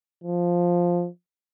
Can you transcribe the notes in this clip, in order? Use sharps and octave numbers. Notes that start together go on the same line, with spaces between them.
F3